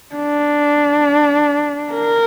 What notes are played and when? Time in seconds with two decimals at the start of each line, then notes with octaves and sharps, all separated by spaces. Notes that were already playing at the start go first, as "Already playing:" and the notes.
0.15 D4
1.93 A#4